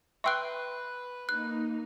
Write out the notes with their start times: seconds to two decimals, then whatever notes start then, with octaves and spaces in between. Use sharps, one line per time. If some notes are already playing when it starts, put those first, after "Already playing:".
0.24 B4 E5 G5 C6 C#6 E6 F#6
1.29 A#3 D#4 F#6